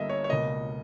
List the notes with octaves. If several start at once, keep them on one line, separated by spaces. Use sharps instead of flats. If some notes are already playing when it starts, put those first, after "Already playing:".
Already playing: G1 G2 A#3 D#5 E5
C#5
C#5
C#2 B2 A#3 D#5